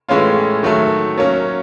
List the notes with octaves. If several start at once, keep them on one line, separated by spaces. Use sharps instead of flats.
A2 E3 G#3 C#4 F4
D#3 F#3 A3
F#3 A#3 C#4